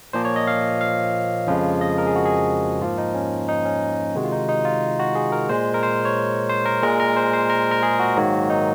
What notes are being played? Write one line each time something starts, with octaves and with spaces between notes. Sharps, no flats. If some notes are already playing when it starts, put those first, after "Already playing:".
A#2 F3 A#3 C5
C#5
D#5
F5
F5
F2 C#3 F3 G#3
D#5
A#4
G#4
F#4
G#4
G#2 F3 A#3 F4
D#4
C#4
D#4
C#4
C3 D#3 G#3 F#4
F4
D#4
D#4
F4
F#4
G#4
A#4
A#2 G#3 C5
A#4
C5
C#5
C5
A#4
A#2 G#3 A#4
A#4
C5
C5
A#4
A#4
G#4
F#4
G#2 D#3 F#3 A#3
D#4